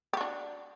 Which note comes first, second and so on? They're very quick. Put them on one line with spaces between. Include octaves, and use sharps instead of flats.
G4 F#4 D4